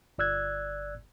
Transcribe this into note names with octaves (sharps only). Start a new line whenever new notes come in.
G1 D5 E6 F#6 G#6